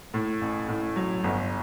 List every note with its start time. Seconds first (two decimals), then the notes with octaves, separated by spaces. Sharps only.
0.14 A2
0.41 A1
0.68 A2
0.96 F#3
1.24 G1